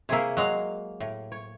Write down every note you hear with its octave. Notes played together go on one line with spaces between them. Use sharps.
C3 A#3 E4 G#4 C#5
F#3 G#3 F5
A2
C#5